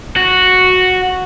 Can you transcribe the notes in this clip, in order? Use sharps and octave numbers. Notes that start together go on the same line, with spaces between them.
F#4